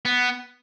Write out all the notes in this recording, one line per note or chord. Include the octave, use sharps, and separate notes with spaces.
B3